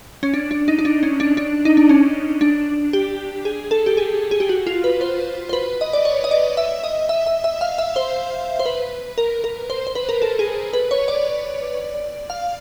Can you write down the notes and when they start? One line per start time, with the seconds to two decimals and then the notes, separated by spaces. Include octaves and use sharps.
0.23 C#4
0.34 D4
0.51 D4
0.68 D#4
0.79 D#4
0.85 D4
1.03 C#4
1.20 D4
1.37 D4
1.65 D#4
1.77 D4
1.89 C#4
2.41 D4
2.93 G4
3.45 G#4
3.71 A4
3.86 G4
3.97 G#4
4.31 G#4
4.40 G4
4.49 F#4
4.67 F4
4.84 B4
5.01 C5
5.49 C5
5.53 B4
5.81 D#5
5.93 D5
6.05 C#5
6.24 D#5
6.31 D5
6.57 E5
6.84 D#5
7.09 E5
7.26 E5
7.44 E5
7.61 F5
7.78 E5
7.96 C5
8.60 C5
8.66 B4
9.18 A#4
9.44 A#4
9.70 C5
9.87 C5
9.95 B4
10.09 A#4
10.22 A4
10.39 G#4
10.73 B4
10.91 C#5
11.08 D5
12.30 F5